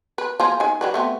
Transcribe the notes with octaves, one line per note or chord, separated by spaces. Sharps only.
B4
F3 A#3 G#4
D#3 G#5
F#3 G3 B4
A3 B3 C4